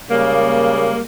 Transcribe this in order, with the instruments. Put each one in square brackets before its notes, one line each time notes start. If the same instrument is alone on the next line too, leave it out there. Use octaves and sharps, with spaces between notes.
[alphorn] C#3 [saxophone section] G3 G#3 A#3